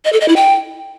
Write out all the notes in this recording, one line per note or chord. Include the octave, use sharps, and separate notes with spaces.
D#5
A4
D#5
E4
G5